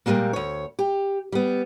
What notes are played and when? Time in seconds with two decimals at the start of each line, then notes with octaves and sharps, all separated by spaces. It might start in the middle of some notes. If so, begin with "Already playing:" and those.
0.06 A#2 D#3 G3 G#3 A#3
0.33 D2 C#5
0.79 G4
1.32 G3 B3